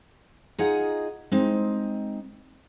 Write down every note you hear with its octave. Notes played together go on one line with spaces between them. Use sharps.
D#4 F4 G#4 D#5 F#5 A#5
G#3 C4 D#4